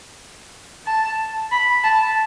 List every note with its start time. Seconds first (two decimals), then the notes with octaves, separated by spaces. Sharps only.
0.87 A5
1.52 B5
1.83 A5